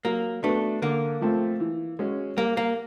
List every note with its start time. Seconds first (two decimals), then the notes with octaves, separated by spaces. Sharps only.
0.05 F#3 A#3
0.44 A3 B3 D4 F#4
0.82 D3 A#3
1.21 F3 A3 C4
1.60 E3
1.99 G#3 C#4 F#4
2.37 G3 A#3
2.57 A#3